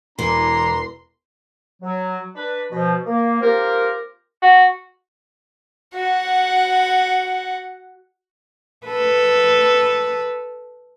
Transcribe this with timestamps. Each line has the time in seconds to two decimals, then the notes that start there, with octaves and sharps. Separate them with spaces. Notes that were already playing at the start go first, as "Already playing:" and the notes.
0.19 E1 E3 D4 E4 A#5 C6
1.82 F#3
2.35 D4 B4
2.72 B2 F3
3.06 A#3
3.41 A#3 C4 F4 G4 A#4
4.42 F#4
5.95 F#4 F#5
8.87 A4 B4